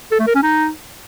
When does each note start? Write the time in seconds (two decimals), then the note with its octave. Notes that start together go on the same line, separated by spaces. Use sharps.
0.12 A4
0.19 A3
0.27 A#4
0.35 C#4
0.43 D#4